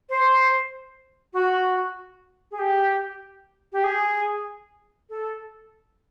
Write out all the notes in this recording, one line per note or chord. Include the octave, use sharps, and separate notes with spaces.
C5
F#4
G#4
G4
G4
G#4
A4